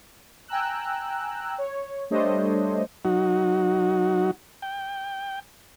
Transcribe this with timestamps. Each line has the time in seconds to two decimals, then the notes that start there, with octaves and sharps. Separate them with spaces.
0.48 G5 G#5 A#5 E6 F#6
1.58 C#5
2.10 G3 A3 D4 C5 C#5 D#5
3.05 F#3 D#4 F#4
4.62 G5